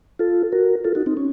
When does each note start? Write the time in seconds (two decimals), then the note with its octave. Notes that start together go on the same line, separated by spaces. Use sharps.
0.19 F4 A4
0.52 F#4 A#4
0.85 F4 A4
0.95 D#4 F#4
1.06 C4 D#4
1.17 C#4